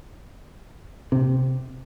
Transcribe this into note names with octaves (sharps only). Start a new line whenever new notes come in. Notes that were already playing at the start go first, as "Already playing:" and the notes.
C3